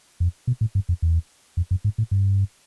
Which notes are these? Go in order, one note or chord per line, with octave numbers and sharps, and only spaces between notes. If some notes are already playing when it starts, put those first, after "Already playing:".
F2
B2
A2
G2
F2
E2
F2
F#2
G#2
A2
G2